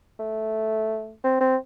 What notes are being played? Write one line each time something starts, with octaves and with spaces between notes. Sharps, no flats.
A3
C4
C4